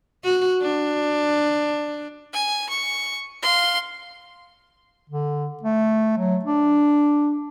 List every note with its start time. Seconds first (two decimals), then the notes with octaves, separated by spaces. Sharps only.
0.24 F#4
0.61 D4
2.33 G#5
2.70 C#6
3.43 F5 C6
5.10 D3
5.63 A3
6.18 F#3
6.45 D4